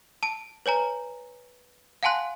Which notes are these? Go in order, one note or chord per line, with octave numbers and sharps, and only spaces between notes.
A5 D7
B4 C#5 G#5 A#5
F5 F#5 G#5 A5 C6 F#6